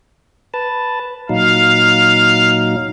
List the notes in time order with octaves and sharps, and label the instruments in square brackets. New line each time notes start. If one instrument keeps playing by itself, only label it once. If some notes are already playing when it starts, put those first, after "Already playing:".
[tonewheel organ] B4 A5
[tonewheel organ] A#2 F#3 D#4 [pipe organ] F5